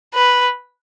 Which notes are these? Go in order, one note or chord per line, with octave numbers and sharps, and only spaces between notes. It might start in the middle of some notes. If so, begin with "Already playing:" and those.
B4